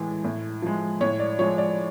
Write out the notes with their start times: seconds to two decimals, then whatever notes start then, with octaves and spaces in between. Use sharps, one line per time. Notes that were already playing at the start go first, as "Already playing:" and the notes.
Already playing: A2 E3 G#3
0.24 A2
0.62 F3 G#3
1.01 A2 C#5
1.19 D5
1.39 F3 G#3 C#5
1.58 D5